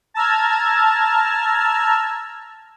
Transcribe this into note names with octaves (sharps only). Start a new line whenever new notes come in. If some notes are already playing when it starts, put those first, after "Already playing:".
A5 A#5 E6 F6 G#6